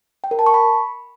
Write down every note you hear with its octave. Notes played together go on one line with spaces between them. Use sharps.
G5
A#4
A5
C#6
B5